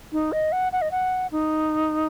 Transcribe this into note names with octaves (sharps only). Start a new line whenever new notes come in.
D#4
D#5
F#5
F#5
D#5
F#5
D#4